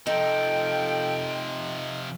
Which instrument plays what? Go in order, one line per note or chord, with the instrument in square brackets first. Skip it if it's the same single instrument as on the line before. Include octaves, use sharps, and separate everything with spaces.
[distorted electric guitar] C3 F3 [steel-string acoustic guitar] D#4 [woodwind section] A4 G5